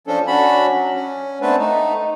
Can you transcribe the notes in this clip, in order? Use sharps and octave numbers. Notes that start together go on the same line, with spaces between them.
F3 C#4 D4 A4
C#4 D4 F#4 B5
F#3
C#4
A3 B3 C4 D4 B4
A3 D#4